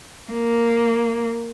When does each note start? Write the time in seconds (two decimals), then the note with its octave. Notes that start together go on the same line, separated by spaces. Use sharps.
0.30 A#3